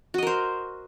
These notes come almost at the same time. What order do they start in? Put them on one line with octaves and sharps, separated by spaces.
F#4 D#5 A#4 C5